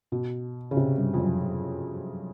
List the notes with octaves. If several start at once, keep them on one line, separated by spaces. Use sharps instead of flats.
B2
C#3
C3
G2
F2
F#2